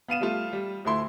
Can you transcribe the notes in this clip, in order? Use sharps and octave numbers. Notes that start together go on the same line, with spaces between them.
B3 F5 D#7 E7
G3 A3 F4
G3
D2 A3 E4 C6